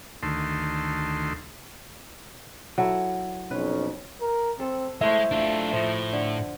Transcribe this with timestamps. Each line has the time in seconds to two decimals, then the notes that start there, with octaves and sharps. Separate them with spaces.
0.23 D2 D#3 A3 C6
2.78 F#3 E4 A4
3.51 B1 F2 C#4 B4
4.21 A#4
4.60 C4 A4
5.01 G#3 A3 E4 C5 C#5 E5
5.31 A3 D4 F4
5.72 A2 F3 F4 D#5
6.13 D3